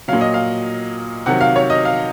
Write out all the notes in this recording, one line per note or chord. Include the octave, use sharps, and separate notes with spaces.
A#2 F#3 F5
D#5
F5
C3 D#3 F#3 F#5
F5
C#5
D#5
F5